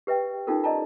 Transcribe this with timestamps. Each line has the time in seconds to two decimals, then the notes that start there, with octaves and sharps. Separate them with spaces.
0.07 G4 B4 E5 G5
0.47 C#4 D#4 F4 G4 A4 A#4
0.64 D5 D#5 A5 A#5